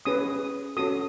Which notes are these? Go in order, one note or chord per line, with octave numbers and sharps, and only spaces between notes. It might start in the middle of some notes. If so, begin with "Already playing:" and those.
C#4 G#4 B4 D#6
C#4 F#4 A4 D#6